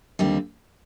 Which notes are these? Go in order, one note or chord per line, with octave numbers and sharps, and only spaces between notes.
D#2 D3 G3 C4 F4